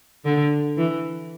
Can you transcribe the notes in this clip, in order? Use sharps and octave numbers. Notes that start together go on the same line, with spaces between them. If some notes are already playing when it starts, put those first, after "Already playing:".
D3
E3